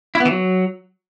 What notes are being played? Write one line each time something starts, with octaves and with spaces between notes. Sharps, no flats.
E4
B3
E3
F#3